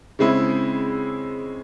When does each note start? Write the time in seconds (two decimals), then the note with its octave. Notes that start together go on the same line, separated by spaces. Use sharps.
0.19 C#3 G#3 C4 E4